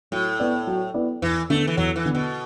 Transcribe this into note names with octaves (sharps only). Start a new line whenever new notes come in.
A2 F#3
B3 E4 B4 D5
F#3
B3 E4 B4 D5
E2 E3
D3 A3 B3 D4
E3
E2 F#3
E3
D3 B3 D4
B2